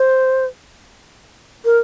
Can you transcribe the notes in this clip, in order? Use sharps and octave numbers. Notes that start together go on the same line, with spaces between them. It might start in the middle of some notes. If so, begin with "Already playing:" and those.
Already playing: C5
A#4